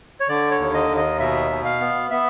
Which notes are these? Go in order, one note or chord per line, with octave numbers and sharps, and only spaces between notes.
C#5
D3 D5
C#5
D#2
D#5
D#2
D#5
B2 E5
B2
F5
B3
B3 E5